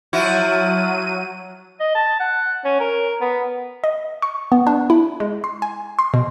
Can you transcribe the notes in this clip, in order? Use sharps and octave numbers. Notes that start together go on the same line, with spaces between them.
F3 F#3 E4 F#4 D#7
D#5
A5
F#5
C#4
A#4
B3
D#5
C#6
B3
D4
E4
G#3
C6
G#5
C6
B2